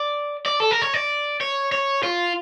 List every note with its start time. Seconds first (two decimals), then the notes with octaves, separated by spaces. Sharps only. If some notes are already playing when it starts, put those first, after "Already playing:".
Already playing: D5
0.46 D5
0.60 A4
0.71 A#4
0.82 C#5
0.94 D5
1.41 C#5
1.72 C#5
2.03 F4